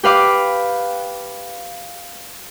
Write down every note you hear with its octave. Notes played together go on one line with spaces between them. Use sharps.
G4 B4 F5 D6